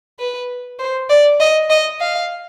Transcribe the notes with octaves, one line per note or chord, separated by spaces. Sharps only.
B4
C5
D5
D#5
D#5
F5